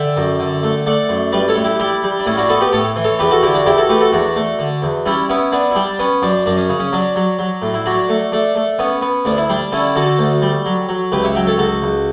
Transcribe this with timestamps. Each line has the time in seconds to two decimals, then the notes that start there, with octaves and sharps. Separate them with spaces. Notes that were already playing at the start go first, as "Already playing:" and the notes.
Already playing: D3 E5 G5
0.17 F#2
0.39 D3
0.63 A3
0.86 A3 D5 F#5
1.09 F#2
1.32 G3 B4 D5
1.48 A4 C#5
1.56 A2
1.64 E4 G4
1.79 G3 E4 G4
2.03 G3
2.19 D4
2.26 A2 C#4 E4
2.38 D4 F#4
2.49 B3 F#4 A4
2.61 G4 B4
2.73 A2 A4 C#5
2.96 E3
3.04 A4 C#5
3.19 E2 G4 B4
3.31 F#4 A4
3.43 D3 E4 G4
3.55 D4 F#4
3.66 E2 E4 G4
3.78 F#4 A4
3.89 A3 G4 B4
4.01 F#4 A4
4.12 E2 D4 F#4
4.36 A3
4.59 D3
4.82 E2
5.06 G3 C#4 E4
5.29 B3 C#4 E4
5.52 B3 D4
5.71 E4
5.75 G3 D4
5.99 B3 C#4
6.22 F#2 D4
6.46 F#2 D4
6.57 C#4
6.69 C#3
6.79 C#4
6.93 F#3 D4
7.16 F#3
7.39 F#3
7.62 A2
7.74 E4
7.85 F#3 D4 F#4
8.09 A3
8.32 A3 D4
8.55 A3
8.79 B3 C#4
9.02 B3
9.25 D2 D4
9.37 E4
9.49 G3 D4
9.72 D3 C#4 E4
9.95 D3 F#4 A4
10.19 D2
10.42 G3
10.66 F#3
10.89 F#3
11.12 C#2 G4 B4
11.23 C#5 E5
11.35 F#3 E5 G5
11.47 A4 C#5
11.58 C#2 F#4 A4
11.82 C#2